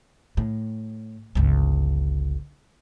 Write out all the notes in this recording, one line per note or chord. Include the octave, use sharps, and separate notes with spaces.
A2
G1 C#2